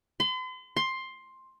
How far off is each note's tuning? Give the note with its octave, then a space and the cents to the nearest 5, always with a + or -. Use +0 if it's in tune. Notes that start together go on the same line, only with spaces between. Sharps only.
C6 -45
C6 +10